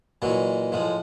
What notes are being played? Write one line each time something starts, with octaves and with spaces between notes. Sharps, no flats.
A#2 E3 F#3 G#3
A2 F3 G#3